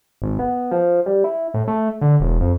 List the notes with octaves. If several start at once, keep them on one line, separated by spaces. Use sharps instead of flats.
G#1
B3
F3
G3
E4
A2
A3
D3
E1
F2